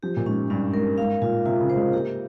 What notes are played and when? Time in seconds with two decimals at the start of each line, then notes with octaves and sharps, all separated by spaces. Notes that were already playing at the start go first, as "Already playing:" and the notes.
0.03 F3 G4
0.17 A#2
0.26 G#2 C#4
0.50 G2 C#4
0.74 G#2 A#4
0.98 G#2 F5
1.22 A#2 F4
1.45 C3 F4
1.61 C#3
1.70 C5
1.77 G#3
1.93 A#3 G4